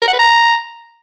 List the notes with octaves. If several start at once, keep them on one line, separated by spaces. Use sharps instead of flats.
A#4
F#5
B4
A#5